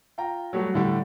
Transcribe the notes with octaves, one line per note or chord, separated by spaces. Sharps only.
F4 G5 A#5
F#3 G3 A3 F#4
A2 D3 G3